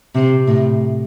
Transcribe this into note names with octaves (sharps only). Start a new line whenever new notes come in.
C3
A2